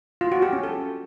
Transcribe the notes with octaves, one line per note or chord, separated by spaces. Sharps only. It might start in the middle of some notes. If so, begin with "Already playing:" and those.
F4
F#4
G4
C#4
A4